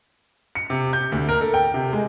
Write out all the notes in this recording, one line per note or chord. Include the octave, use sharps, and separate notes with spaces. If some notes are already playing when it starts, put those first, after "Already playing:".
C#7
C3
G6
D2
A#4
A4
G5
C3
G#3